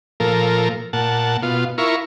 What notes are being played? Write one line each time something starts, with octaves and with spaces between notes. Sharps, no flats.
A#2 F3 A4 A#4
A#2 F#5 A5
B2 F4
E4 F4 A#4 C#6